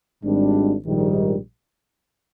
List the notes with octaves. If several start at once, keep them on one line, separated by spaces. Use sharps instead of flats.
G#1 G#2 G3 D4
A#1 G#2 D#3 G3